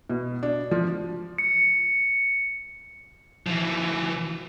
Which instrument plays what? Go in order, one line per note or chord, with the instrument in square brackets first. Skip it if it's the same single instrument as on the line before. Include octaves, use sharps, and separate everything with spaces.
[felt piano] B2
D4
F3
[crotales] C#7
[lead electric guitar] E3 F3